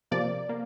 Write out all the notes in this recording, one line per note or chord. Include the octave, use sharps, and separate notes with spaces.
C3 F3 A#3 D5
A#3